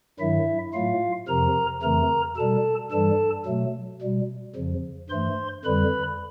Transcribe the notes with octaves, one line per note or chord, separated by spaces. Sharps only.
G2 D#3 F#3 E4 E5
A2 F#3 A3 F4 F5
F2 C3 F3 A#4 A#5
F2 C#3 E3 A3 A#4 A#5
B2 G3 A4 A5
G2 E3 G3 A4 A5
B2 F#3 A3
B2 G3
F2 C#3 F3
G2 E3 A3 C5 C6
F2 D3 G3 B4 B5